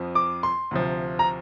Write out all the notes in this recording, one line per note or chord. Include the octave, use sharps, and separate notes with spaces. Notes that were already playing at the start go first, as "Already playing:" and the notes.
Already playing: F2 F3
D6
C6
D2 C3 F3
A#5